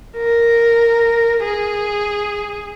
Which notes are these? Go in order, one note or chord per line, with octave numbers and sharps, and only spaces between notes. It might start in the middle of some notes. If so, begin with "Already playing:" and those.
A#4
G#4